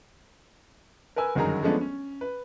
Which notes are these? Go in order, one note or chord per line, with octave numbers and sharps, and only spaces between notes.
A#4 B4 G#5 E6
G1 F#2 D#3 F#3 G#4 A#5
F3 G#3 A3 B3 C#4 D4
C#4
B4